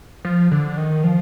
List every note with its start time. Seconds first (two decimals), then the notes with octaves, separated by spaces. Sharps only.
0.25 F3
0.51 D3
0.77 D#3
1.04 F3